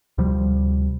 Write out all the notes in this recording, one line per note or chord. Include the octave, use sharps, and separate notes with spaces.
D2 C3 F3 G3